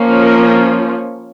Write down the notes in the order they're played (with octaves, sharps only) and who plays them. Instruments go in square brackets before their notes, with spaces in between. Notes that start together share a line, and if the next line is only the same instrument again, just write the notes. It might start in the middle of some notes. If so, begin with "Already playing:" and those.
Already playing: [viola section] F3 A#3 C#4
A#4